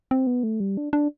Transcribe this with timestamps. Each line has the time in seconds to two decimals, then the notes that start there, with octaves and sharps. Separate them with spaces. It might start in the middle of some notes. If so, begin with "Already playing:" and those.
0.11 C4
0.27 B3
0.43 A3
0.60 G3
0.77 D4
0.93 D4